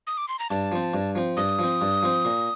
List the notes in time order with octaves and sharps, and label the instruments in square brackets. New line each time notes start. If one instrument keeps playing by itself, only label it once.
[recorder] D#6
D6
C6
A#5
[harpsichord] G2 [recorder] A5
[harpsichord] F3 C4
G2
F3 C4
[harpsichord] G2 [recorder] D#6
[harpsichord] F3 C4
G2
F3 C4
A#2